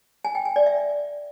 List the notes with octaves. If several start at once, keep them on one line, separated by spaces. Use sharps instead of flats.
G#5
G5
G#5
D5
E5